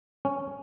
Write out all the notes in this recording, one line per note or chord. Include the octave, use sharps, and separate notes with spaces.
C#4